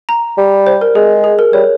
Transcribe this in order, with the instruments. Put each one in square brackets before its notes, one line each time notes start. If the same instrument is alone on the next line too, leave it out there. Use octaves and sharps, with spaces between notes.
[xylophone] A#5
[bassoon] G3
[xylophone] C5
A#4
[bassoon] G#3 [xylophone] G#4
[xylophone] G#4
A#4
[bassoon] G3 [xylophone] C#5